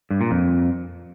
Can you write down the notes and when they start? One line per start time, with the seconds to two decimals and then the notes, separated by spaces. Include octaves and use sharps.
0.10 G2
0.21 A#2
0.31 F2